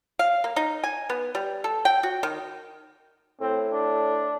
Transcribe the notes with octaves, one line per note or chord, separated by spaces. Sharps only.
F5
A#3
D#4
G#5
B3
G3
A4
G5
F#4
D#3
A2 C4
D4